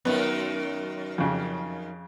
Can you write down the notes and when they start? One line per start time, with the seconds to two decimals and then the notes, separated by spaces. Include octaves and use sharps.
0.05 F#2 D#3 B3
1.18 F2 C#3